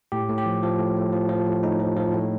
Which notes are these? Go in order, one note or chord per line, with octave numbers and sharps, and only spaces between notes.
A2 G4
A2
G4
F3
F3
A2
A2
F3
F3
A2
A2 D#4
F3
F3
A2